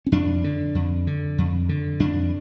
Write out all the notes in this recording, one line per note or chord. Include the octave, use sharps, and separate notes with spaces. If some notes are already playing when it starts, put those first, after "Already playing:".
C#4
F2 D4
D3
F2
D3
F2
D3
F2 D4